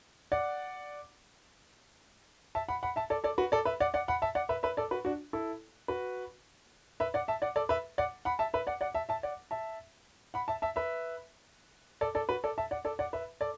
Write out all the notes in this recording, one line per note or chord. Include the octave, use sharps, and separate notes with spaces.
D5 F#5
E5 A5
F#5 B5
F#5 B5
E5 A5
A4 D5
A4 D5
F#4 B4
A4 D5
B4 E5
D5 F#5
D5 F#5
F#5 B5
E5 A5
D5 F#5
B4 E5
B4 E5
A4 D5
F#4 B4
D4 F#4
E4 A4
F#4 B4
B4 E5
D5 F#5
E5 A5
D5 F#5
A4 D5
B4 E5
D5 F#5
F#5 B5
E5 A5
B4 E5
D5 F#5
D5 F#5
E5 A5
E5 A5
D5 F#5
E5 A5
F#5 B5
E5 A5
E5 A5
B4 E5
A4 D5
A4 D5
F#4 B4
A4 D5
E5 A5
D5 F#5
A4 D5
D5 F#5
B4 E5
A4 D5